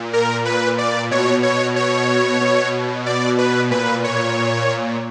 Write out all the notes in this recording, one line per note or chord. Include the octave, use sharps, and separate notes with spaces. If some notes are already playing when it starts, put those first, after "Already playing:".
Already playing: A#2
A#4
B4
D5
B2 C#5
C#5
C#5
B2
D5
B4
A#2 B4
C#5